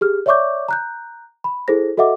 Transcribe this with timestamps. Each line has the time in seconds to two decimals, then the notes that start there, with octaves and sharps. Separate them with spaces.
0.01 G4 G#4 F6
0.26 C#5 D5 E5 C#6 D6 G6
0.68 A#5 F#6 G6
1.44 B5
1.68 E4 G#4 A4 C5 A#6
1.97 F#4 A4 D#5 E5 F#5 D6